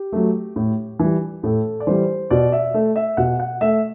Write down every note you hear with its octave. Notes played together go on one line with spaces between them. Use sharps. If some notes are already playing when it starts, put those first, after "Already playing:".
Already playing: G4
F#3 A3
A2
E3 G3
A2 A4
D5
E3 G3 C5
B2 D5
E5
A3
E5
B2 F#5
F#5
A3 E5